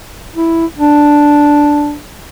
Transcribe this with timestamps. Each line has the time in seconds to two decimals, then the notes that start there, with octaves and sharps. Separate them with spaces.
0.36 E4
0.78 D4